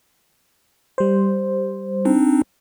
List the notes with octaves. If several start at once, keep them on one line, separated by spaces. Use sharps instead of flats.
G3 C5
C4 D4 D#4